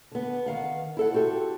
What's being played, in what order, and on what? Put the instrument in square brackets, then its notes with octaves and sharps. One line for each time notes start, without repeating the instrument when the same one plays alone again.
[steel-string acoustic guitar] D3 B3
D#3 F5 F#5
E4 A4 F#5
C4 F#4 G4 A4